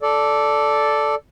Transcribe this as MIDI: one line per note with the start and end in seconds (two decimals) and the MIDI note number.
0.02 1.15 69
0.02 1.15 74